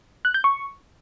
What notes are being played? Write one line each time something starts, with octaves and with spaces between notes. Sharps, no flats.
F#6
G6
C#6